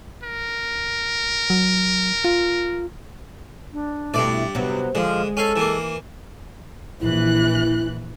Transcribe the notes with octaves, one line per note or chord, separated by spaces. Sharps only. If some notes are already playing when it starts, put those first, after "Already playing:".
A#4
F#3
F4
D4
G2 B2 A3 E4 D5
C3 F#3 B3
D3 F3 G#3
C#4 A4 F5
E3 A#3
A#1 E3 E4 F#6